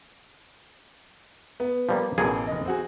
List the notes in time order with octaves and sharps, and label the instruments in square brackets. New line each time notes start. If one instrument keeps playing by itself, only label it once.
[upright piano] B3
[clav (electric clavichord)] F3 G3 A#3
[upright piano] A1 [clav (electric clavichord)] B2 A#3 G#4
[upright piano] F1 D#5
C4 F#4 G#4